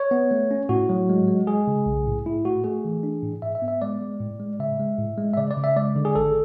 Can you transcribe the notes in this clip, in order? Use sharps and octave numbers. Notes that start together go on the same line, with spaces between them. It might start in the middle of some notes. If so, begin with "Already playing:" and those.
Already playing: C#5
B3
A3
C#4
A2 F#4
F#3
G#3
G#3
G#3 G#4
C#3
B1
A2
A2 E4
A3 F#4
A3 G#4
E3
D4
A2
G#2 E5
E5
B3
E5
G#3 D5
G#3
A2
G#3
C#3 E5
G#3
A2
G#3
E5
C#3 D5
D5
C#3
E5
G#3 D5
D3
G#4
G#1 A4